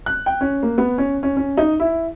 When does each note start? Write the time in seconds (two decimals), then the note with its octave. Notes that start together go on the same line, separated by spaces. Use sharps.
0.06 F#6
0.26 G5
0.41 C#4
0.63 A#3
0.78 B3
0.98 C#4
1.23 C#4
1.37 C#4
1.57 D#4
1.80 E4